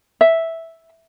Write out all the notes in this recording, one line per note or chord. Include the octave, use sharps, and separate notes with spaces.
E5